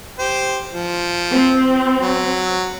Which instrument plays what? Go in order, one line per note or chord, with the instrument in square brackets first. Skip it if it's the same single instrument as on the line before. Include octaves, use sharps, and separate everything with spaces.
[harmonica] G4 C5
F3
[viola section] C4
[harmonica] F#3